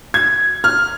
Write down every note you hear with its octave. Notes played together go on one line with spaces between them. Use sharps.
G#6
F6